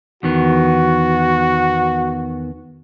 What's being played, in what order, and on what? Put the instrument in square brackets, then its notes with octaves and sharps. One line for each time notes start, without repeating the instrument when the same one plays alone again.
[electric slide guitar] E2 D#3 B3 [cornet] F#4